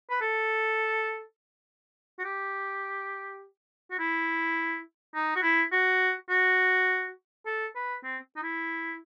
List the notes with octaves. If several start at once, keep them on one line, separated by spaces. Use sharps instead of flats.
B4
A4
F#4
G4
F#4
E4
D#4
F#4
E4
F#4
F#4
A4
B4
C4
D#4
E4